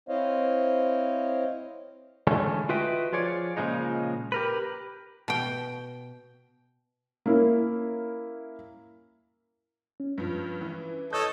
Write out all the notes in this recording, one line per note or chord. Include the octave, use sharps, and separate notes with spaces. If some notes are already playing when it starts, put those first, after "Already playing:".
C4 E4 C5 C#5 D#5 F5
D3 E3 G#3 A3 C#4
F4 F#4 B4 D#5 E5 G5
F3 F4 G#4 C#5 D5
A#2 C#3 F3 G#3 D#4
G4 A#4 B4
B2 G5
A#3 C#4 E4
C#4
G2 F3
E3
A4 C#5 D#5 G6